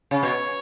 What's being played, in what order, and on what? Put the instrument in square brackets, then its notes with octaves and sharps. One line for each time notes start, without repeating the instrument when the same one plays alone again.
[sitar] C#3
[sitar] B2 [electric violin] C#5